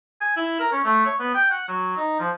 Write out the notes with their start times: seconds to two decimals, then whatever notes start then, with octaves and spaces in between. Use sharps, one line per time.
0.21 G#5
0.37 E4
0.59 A#4
0.72 C#4
0.84 A3
1.06 C#5
1.19 B3
1.34 G5
1.50 F#5
1.68 F#3
1.97 D#4
2.19 F3